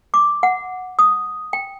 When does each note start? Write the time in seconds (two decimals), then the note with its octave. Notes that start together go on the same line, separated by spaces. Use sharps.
0.14 D6
0.43 F#5
0.99 D#6
1.53 G5